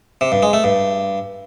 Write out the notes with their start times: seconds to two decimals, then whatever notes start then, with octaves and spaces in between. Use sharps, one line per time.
0.21 C3
0.32 G2
0.43 G#3
0.53 A3
0.64 G2